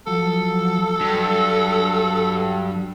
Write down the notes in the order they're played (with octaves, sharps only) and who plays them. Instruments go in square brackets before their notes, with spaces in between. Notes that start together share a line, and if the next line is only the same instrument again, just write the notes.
[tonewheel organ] F3 F#3 [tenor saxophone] A4
[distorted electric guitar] G2 [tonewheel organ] F#3